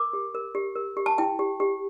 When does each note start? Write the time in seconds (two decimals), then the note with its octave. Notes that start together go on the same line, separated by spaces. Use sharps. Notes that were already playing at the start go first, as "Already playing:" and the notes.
Already playing: A#4 D6
0.13 G4
0.35 A#4
0.55 G4
0.76 A#4
0.97 G4
1.06 A5
1.18 E4 G5
1.39 G4
1.60 G4